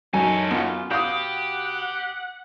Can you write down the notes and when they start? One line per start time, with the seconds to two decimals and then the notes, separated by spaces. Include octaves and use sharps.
0.14 F#2 C#4 D#4 A4 G#5
0.51 F#2 B3 F4
0.91 B2 G4 F5 F#5 D#6 G6